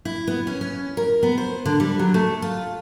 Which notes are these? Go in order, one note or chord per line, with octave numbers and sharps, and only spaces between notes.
E4
B3
C#4
C#4
A#4
B3
C5
D3
G3
F#3
A3
F4